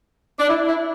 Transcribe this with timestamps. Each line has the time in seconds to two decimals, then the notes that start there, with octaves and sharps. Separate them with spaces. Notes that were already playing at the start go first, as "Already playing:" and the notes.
0.39 D4
0.48 E4
0.67 E4